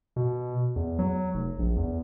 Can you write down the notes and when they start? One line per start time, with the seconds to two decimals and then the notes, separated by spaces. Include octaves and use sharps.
0.16 B2
0.76 E2
0.99 F#3
1.34 F1
1.59 A#1
1.76 E2